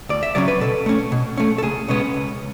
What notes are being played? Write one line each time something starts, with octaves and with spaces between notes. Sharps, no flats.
D2 D5
E5
C#3 F#3 C#4 D5
B4
B2 A4
A3 C#4
B2
A3 C#4
A4
C#2 G#4
B2 G#3 B3 C#4
C#2